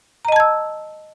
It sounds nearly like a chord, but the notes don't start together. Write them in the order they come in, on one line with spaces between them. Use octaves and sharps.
A#5 D#5 A5 G#6 E6